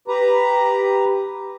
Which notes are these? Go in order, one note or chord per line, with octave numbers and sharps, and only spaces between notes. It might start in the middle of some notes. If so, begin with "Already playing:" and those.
G4 B4 A#5